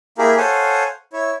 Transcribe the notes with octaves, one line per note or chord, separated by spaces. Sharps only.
A#3 E4 G4 G#4 A#4
A4 C5 C#5 F5 F#5 G#5
E4 C#5